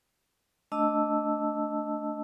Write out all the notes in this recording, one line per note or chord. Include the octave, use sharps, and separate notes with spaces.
A3 D4 D#5 A5 E6